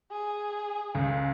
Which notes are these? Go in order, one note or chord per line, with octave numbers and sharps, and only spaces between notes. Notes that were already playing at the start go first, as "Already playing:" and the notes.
G#4
C#2